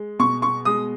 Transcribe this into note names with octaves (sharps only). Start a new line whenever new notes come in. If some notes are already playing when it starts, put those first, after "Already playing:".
Already playing: G#3
B2 C#6
C#6
G#3 D#6